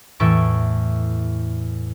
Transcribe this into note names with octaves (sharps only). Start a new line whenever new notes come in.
E2 A2 E3 A4 C#6 D7